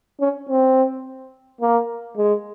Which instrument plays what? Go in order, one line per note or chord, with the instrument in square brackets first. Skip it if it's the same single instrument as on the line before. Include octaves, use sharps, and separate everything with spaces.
[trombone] C#4
C4
A#3
G#3